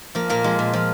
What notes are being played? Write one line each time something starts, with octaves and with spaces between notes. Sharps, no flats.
F3 A#3
A#2 A#3
F3 G#3
A#2
F3